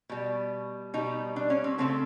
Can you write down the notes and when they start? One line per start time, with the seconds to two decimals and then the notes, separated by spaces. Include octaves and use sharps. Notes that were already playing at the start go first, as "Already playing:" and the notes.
0.09 B2 G3
0.94 B2 G3 D#4
1.36 D4
1.50 C#4
1.64 C4
1.78 C#3 F#3 A3 C4